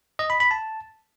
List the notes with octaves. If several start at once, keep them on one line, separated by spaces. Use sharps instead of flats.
D#5
B5
B5
A5